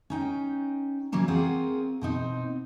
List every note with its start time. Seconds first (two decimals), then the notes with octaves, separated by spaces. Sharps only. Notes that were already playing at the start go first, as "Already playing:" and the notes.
0.10 C#4 D#4 G5
1.12 C#3 E3 F#3 A#3 C#4
1.28 C4 F4 F#4 G#4 A#4
2.01 B2 C4 D#4